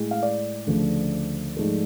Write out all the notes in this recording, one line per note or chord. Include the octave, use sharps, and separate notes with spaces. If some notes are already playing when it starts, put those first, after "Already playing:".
Already playing: A2 G#3
F5
D5
D2 C#3 F3 A3
G#2 F3 A3